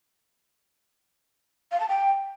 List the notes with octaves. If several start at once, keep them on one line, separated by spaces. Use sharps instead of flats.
F5
A5
G5